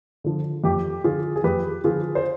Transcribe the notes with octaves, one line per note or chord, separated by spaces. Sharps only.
D3 F3
F2 G4
D3 F3 F4 G#4
G#4
F2 G4 B4
D3 F3 F4 G#4
C5